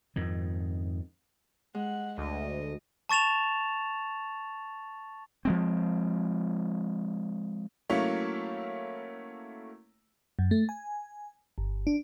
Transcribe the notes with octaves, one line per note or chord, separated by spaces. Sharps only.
F2 G#2 D#3
G#3 F#5
D2 D#5
A5 C#6 A6 E7 F7
F3 G#3 C4
F#3 A3 A#3 C#4 E4
F#2
A3
G#5
G1
D4